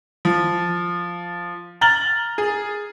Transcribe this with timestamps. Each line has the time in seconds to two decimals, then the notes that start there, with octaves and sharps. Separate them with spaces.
0.25 F3
1.81 A#5 F6 A6 F#7 G7
2.38 G#4